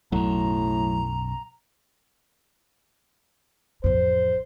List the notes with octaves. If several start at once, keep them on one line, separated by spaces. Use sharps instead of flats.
B1 F#2 A2 F#3 A#5
A1 F2 C5